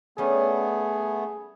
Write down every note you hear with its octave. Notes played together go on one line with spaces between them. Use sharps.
G3 A3 B3 C#4 G#4